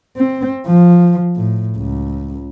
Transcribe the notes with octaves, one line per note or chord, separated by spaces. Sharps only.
C4
F3
A2
C#2